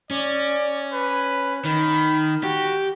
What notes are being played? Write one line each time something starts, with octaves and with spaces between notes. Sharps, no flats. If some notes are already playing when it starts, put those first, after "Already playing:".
C#4 D5
B4
D#3 B5
F#4 G4